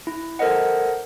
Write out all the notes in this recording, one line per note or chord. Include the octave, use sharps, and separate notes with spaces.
E4
A4 A#4 C5 D#5 F#5